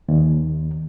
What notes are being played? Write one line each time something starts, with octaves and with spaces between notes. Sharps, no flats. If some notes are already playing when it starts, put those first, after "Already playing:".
D#2